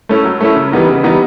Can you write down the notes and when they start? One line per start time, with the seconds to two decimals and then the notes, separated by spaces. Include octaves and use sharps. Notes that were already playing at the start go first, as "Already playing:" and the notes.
0.09 A3 C#4 E4
0.25 F#3
0.41 A3 C#4 E4
0.56 C#3
0.72 E3 G3 B3 D#4
0.88 C#3
1.03 E3 G3 B3 D#4